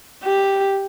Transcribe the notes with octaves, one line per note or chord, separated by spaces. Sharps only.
G4